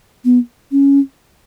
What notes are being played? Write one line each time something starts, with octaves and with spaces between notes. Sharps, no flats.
B3
C#4